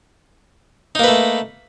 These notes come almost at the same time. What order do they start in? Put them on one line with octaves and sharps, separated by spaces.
D#4 A#3 B4 A3